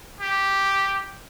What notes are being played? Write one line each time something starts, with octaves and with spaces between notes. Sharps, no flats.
G4